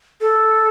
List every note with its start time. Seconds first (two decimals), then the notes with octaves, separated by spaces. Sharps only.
0.21 A4